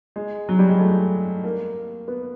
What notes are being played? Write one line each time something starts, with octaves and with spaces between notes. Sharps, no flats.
G#3
F#3
G3
G#3
A3
A#3
B3